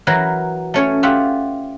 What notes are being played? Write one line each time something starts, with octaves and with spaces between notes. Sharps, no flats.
E3 F#3 A#4 B4
A3 C#4 C#5
F4 G4 E5 F#5